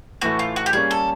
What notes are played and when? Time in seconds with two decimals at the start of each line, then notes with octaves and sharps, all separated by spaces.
0.21 A2 E3 A3 F#4
0.39 F4
0.56 F#4
0.66 G4
0.73 G3 A#3 C#4 G#4
0.91 A4